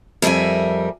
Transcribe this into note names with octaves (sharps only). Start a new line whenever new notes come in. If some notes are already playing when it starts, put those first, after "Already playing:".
F2 G3 A#4 E5 G#5